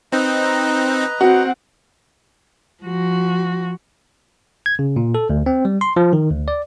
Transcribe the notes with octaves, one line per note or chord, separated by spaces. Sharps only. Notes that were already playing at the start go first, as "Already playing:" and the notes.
C4 D#4 B4 D#5 A#5
C4 F#4 F#5
F3 F#4
G#6
C#3
A#2
A4
D2
C4
G3
C6
F3
D#3
D2
D5